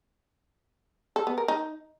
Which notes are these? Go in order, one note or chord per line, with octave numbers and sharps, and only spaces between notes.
A4
B3
A#4
D#4